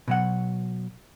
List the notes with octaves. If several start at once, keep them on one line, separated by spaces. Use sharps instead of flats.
B2 F#3 F#5